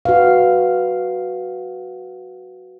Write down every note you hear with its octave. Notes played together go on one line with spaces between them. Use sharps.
F#4 B4 F5